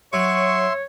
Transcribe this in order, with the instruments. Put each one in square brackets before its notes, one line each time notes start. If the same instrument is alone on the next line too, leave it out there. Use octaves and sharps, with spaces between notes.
[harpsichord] F#3 [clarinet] C#5 [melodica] E5 C6 [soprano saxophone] C#6